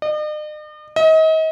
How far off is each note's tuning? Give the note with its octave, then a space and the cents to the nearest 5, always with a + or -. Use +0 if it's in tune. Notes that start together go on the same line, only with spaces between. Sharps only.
D#5 -45
D#5 +35